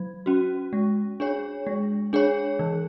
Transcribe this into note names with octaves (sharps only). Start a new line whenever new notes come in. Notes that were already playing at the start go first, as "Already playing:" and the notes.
Already playing: F#3
C#4 F#4
G#3
D4 G#4 C#5
G#3
D4 G#4 C#5
E3